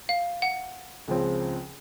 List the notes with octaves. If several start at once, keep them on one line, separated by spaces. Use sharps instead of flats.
F5
F#5
C#2 C#3 F3 C4